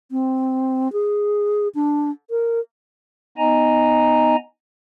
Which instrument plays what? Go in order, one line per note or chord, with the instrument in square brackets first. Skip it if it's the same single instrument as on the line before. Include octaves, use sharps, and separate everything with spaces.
[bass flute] C4
G#4
D4
A#4
[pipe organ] B3 D#4 D#5 G#5 A#5